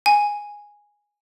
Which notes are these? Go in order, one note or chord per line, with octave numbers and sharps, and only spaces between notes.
G#5